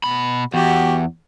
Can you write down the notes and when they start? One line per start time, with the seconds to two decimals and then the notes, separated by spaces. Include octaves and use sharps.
0.04 B2 B5
0.54 E2 F#4 G4